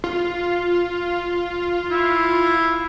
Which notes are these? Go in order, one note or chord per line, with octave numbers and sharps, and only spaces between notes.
F4
E4